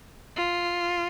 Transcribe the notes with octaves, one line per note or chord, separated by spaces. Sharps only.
F4